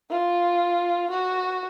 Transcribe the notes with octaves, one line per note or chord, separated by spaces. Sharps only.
F4
F#4